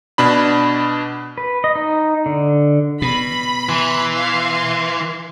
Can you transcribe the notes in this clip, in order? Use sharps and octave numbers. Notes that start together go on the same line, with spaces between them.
B2 D4 B5
B4
D#5
D#4
D3
B2 B5
E3 C6
F5